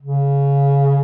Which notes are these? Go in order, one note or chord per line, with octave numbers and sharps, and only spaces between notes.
C#3